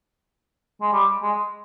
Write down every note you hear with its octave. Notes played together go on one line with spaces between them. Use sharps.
G#3
G3
G#3